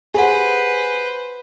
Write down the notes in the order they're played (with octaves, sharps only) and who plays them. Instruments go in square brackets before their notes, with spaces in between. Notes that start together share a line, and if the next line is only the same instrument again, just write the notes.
[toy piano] G4 F#5 [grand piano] G#4 [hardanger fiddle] B4 C5